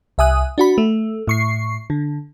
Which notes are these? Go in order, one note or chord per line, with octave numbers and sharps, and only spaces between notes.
C2 E5 G#5 D#6 F#6
D4 F#4 B5
A3
A2 C#6 C7
D3